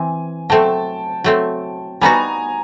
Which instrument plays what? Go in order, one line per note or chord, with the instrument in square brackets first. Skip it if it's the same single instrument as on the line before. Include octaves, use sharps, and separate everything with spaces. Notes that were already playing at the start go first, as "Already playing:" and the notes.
Already playing: [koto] E3 C4 [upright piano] G#5
[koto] F#3 A3 C4 [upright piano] G5 A5
[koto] F#3 A3 C4
[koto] G3 B3 D#4 F#4 [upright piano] G#5 A#5